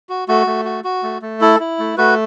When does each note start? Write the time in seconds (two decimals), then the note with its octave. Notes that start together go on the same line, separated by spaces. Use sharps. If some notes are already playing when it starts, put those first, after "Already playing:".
0.09 F#4
0.28 A3 F#4
0.47 A3
0.65 F#4
0.84 F#4
1.03 A3
1.22 A3
1.41 E4 A4
1.60 E4
1.79 A3
1.97 A3 F#4 B4